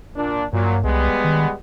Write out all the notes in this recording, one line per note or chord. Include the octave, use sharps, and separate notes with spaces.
A#2 D4
G2 A#2 F#3
C2 G3 G#3 B3
D#3